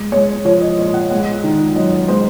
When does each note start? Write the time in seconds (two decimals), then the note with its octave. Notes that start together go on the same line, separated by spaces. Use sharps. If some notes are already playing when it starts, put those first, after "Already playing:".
Already playing: G#3
0.12 G#3 C#5
0.45 F3 C#5
0.61 D#5
0.77 A#2 D#5
0.94 F#5
1.11 G#3 F#5
1.44 D#3
1.75 F#2 D#5
2.08 G#3 C5